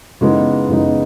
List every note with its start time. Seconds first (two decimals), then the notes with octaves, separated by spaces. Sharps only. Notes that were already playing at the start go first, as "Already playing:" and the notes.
0.21 C#3 E3 G#3 B3 D#4
0.69 C#3 E3 G#3 B3 D#4